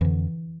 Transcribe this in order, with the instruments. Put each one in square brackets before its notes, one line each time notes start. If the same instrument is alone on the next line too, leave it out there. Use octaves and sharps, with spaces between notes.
[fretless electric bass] F2 D3 E3